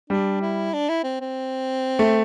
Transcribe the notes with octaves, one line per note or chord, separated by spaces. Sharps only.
G3 D4
E4
D4
E4
C4
C4
A3